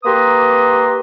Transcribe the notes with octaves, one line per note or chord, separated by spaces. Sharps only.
A#3 G4 B4 A#5 C6 D#6